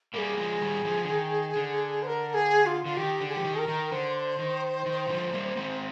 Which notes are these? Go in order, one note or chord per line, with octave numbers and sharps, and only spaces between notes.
G3 A#3 G#4 A#4
F3 G#3
D#3 G3
D3 F3
D3
D#3
D3
C5
A#4
G#4
F4
D3 F4
D#3 G4
D3
G#4
F3 G4
D#3
A#4
D#3
D3 C5
D#3
D#3
D3 F3
G3 A#3
G#3 C4